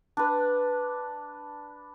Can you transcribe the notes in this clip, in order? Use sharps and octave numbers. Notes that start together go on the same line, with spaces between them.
D4 B4